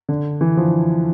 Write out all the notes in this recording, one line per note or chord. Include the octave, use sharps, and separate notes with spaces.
D3
E3
F3